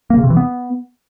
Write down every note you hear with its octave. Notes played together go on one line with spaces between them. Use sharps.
A#3
C#3
C3
E3
B3